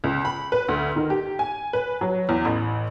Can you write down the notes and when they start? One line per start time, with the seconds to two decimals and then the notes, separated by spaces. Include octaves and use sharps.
0.04 C#2
0.25 B5
0.52 B4
0.68 D2
0.96 D#3
1.10 G4
1.39 G#5
1.73 B4
2.01 F#3
2.29 E2
2.45 A1